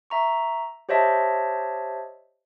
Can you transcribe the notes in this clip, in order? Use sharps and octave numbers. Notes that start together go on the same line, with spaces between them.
E5 A#5 C#6
G4 C5 C#5 D#5 E5 A5